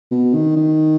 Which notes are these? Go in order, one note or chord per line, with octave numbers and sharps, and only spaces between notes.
B2
D#3
D#3